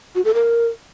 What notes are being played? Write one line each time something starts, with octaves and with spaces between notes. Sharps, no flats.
F#4
A4
A#4